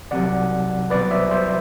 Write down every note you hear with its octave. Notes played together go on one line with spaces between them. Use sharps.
C2 C3 F#3 D5 F#5
C2 B2 F#3 B4 D5
C5 E5
C5 E5